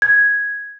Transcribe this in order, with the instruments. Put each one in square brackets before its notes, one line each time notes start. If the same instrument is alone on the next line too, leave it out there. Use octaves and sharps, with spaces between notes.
[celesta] G#6